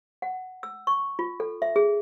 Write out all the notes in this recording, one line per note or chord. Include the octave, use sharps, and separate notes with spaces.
F#5
E6
C#6
F4
A4
E5
G#4